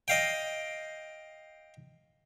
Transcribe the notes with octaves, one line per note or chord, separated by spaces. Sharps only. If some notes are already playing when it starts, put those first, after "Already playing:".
D#5 F5 G5